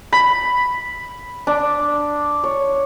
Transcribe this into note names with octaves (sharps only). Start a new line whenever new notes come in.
B5
D4
C#5